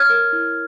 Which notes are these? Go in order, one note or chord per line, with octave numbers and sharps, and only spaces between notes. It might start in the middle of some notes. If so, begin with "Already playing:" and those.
Already playing: C#5 F6 G#6
A#4
E4